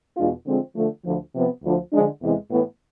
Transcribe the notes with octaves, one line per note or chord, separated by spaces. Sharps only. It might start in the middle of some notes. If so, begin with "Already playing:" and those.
E2 B2 G#3 D4 F4
D3 F3 G#3 C4
D3 F3 A3
D2 D3 F3
C3 F3 B3
D2 D3 F3
D3 F3 G#3 D4
E2 C3 E3 G#3
A2 E3 B3